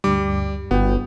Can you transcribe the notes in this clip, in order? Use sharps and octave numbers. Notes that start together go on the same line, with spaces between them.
D2 G2 G3 D6
G1 B3 F#4 G5